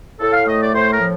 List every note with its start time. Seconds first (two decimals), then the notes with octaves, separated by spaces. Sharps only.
0.20 A2 A4
0.33 F5
0.46 A3 D#5
0.60 D5
0.73 A2 C5
0.91 A#4
1.01 F3